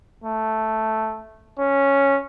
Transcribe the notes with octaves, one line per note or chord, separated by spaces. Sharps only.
A3
C#4